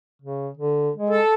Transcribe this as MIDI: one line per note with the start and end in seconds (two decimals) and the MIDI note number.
0.22 0.48 49
0.58 0.90 50
0.96 1.20 56
1.09 1.34 69